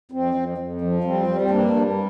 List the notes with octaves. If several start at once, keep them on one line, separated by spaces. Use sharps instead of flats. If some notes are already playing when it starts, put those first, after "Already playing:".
F2 C4
F2
F2
F3
G3 C4
G3
C4
G2 A#3 D4
G3